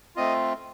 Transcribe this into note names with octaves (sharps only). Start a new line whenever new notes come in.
A3 C4 F4 D#5